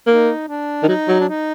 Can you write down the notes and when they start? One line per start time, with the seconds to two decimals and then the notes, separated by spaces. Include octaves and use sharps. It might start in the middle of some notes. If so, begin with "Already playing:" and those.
0.06 A#3 D#4
0.48 D4
0.83 D#3
0.88 F#3 D#4
1.08 F#3
1.20 D4
1.29 D#4